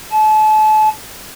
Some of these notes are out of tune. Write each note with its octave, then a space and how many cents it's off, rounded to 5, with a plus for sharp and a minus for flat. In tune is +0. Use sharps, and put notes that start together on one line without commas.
A5 -35